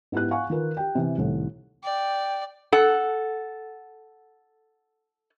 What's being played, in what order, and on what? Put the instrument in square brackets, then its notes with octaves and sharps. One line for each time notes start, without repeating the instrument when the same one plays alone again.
[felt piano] G#2 B3 E4 G4 F#6
F5 F#5 G#5 C#6
D#3 F4 A#4 B4
G4 G5
C3 E3
C2 A2 D#3
[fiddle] D5 [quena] G5
[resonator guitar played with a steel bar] A4 F#5